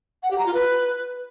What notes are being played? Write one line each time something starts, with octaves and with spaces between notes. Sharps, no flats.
F#5
G4
A#5
F4
B4